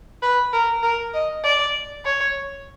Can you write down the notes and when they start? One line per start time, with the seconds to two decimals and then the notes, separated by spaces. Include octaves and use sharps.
0.22 B4
0.53 A#4
0.83 A#4
1.14 D#5
1.44 D5
2.05 C#5